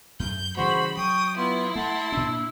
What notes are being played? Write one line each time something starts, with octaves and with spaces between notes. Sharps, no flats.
F#2 G6
C#3 E3 G3 F#4 G#4 C5 B5
F#3 G5 C#6 D#6
B3 E4 F4 C6
A3 F#5 A5 C6
A#2 D4 E6